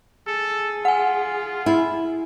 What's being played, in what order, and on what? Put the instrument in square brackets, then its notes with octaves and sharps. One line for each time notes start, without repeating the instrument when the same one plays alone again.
[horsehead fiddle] G#4 [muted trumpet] A4
[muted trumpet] F4 [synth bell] F#5 G#5
[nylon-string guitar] E4